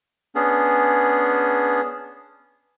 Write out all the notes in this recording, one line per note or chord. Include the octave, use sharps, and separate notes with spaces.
B3 C#4 D4 G#4